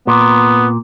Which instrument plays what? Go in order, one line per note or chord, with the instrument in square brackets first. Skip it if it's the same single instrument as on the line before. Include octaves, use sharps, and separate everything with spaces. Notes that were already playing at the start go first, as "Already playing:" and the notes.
[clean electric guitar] A#2 [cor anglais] B3